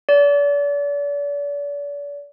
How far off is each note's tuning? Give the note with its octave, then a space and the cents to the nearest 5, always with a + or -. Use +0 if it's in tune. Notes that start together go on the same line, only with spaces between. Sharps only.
D5 -40